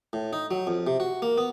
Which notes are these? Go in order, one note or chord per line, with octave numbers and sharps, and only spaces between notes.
A2
D#4
F#3
F2
C3
F#4
A#3
B3